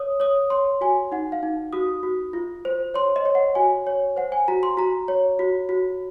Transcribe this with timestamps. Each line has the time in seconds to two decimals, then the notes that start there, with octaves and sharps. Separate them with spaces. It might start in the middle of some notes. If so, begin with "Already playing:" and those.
Already playing: C#5 D#6
0.20 C#5 D#6
0.50 C#5 C6
0.81 F#4 G#5
1.12 D#4 F#5
1.32 F5
1.43 D#4
1.73 F#4 D#6
2.03 F#4
2.33 F4
2.65 C5
2.94 C#5 C6
3.16 D#5
3.25 C#5
3.35 F#5
3.55 F#4 G#5
3.87 C#5
4.17 C5 F#5
4.32 G#5
4.48 F#4 A#5
4.63 C6
4.77 F#4 A#5
5.08 C#5
5.39 F#4
5.69 F#4